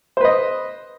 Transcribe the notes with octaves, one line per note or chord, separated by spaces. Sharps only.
B4 C5 D#5